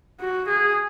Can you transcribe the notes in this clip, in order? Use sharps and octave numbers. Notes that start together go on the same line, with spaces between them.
F#4
G#4